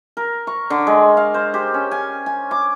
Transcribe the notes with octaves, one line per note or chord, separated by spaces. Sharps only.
A#4
C#6
D3
G#3
F5
C5
G4
C#4
G#5
G#5
D6